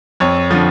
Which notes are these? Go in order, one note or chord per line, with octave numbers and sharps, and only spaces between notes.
F2 C#5
D3 F3